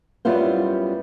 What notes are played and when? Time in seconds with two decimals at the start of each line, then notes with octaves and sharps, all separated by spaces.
0.25 F#2 G3 B3 E4 F4 C5